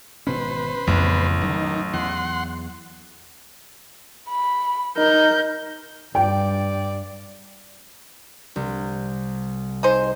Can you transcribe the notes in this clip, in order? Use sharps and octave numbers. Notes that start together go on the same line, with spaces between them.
G#1 B2 C#4 B4 C5
A1 F2 C#3 E3 B3
D#3 F#3
E2 F#5 C6
B5
D#4 A#4 G6
G2 D5 G5
C2
D#4 G#4 C5